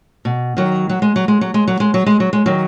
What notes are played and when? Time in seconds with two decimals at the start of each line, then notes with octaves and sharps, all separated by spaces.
0.25 B2
0.57 D#3 F#3
0.89 F#3
1.02 G#3
1.16 F#3
1.28 G#3
1.41 F#3
1.54 G#3
1.68 F#3
1.80 G#3
1.94 F#3
2.06 G#3
2.20 F#3
2.33 G#3
2.46 D#3 F#3